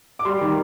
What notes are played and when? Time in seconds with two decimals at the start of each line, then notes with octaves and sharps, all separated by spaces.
0.19 D6
0.25 G3 C6
0.41 D#3